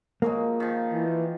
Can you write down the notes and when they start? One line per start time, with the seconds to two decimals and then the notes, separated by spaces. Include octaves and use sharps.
0.22 F3 F#3 G#3 A#3
0.60 D#3 F3
0.92 E3